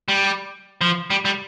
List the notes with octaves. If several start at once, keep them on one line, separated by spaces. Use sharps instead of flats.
G3
F3
G3
G3